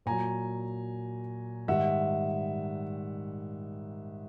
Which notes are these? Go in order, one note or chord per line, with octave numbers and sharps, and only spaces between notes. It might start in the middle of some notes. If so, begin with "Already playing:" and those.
A#2 F#3 G#5 A#5
G#2 D#3 G3 E5 F#5